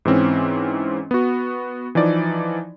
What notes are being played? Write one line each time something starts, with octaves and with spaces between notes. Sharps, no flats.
G#2 E3 C4 C#4
B3 F#4
E3 F3 D#4 D5